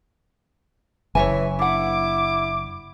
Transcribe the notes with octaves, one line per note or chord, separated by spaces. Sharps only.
F#1 E3 C#5 E5 G#5
D4 E4 F#5 D6